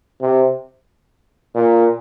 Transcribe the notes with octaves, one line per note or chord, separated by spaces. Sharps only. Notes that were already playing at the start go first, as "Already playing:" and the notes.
C3
A#2